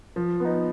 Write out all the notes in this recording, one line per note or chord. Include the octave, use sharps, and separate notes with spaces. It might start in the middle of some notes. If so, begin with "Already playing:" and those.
F3
B3 D#4